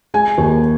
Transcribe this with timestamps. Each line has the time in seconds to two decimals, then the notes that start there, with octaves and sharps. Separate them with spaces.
0.14 G#3 G#5
0.38 D#2